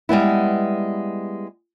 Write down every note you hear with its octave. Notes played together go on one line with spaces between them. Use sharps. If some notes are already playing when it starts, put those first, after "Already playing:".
G3 G#3 B3 E4